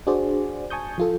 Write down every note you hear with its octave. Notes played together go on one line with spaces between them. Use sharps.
D4 F#4 G#4 C5 D5
G#5 A5 C#6 D#6 G6
F3 F4 A4